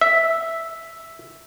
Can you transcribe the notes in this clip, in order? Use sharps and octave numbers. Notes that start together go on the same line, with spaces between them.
E5